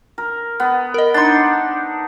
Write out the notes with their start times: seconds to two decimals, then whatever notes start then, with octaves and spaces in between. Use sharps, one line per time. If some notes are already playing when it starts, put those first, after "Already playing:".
0.18 A#4
0.60 B3
0.94 A#4 D#5
1.14 D4 D#4 C6 A6